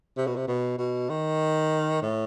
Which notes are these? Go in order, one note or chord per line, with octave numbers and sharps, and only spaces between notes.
C3
B2
C3
B2
B2
D#3
A2